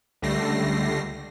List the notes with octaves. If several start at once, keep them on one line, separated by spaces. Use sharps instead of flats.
C#2 D3 G3 A3 A#6 C7